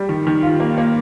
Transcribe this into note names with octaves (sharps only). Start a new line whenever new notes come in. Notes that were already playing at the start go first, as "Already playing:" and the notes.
Already playing: G3
D#3
D#3
F4
A#3
A#3